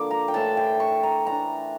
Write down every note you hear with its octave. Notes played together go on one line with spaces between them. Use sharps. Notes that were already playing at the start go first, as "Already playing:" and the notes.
Already playing: D3 F3 A#3 D6
A#5
G5
A2 E3 A3 D4 A5
G5
C#6
A#5
E3 A3 D4 A#5